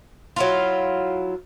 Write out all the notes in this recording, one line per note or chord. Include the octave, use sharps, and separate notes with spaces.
F#3 E4 F4